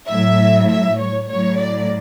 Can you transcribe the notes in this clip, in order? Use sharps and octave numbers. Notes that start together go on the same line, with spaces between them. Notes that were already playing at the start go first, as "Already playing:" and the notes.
A2 F#3 E5
E5
C#5
A2 F#3 C#5
D5